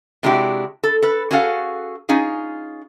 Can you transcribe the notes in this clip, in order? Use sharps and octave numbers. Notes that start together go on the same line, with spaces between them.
C3 G#3 D4 E4 F#4 G4
A4
A4 B4
C#4 F#4 G#4 A4 F5 F#5
C#4 D#4 F4 G#4